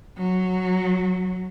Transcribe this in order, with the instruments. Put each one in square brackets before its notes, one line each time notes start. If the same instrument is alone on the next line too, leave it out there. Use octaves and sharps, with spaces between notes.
[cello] F#3